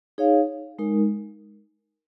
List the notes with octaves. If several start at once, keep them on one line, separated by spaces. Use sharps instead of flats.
D#4 G#4 C#5 F5
G#3 D#4 A#4